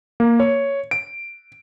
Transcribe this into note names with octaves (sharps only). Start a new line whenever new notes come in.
A#3
C#5
D7